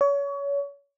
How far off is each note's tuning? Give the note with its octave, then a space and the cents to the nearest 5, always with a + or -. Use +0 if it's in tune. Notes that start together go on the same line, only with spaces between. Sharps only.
C#5 +30